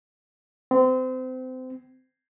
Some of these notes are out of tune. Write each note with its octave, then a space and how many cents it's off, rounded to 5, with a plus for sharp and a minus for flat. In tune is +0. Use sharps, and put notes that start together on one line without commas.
C4 -30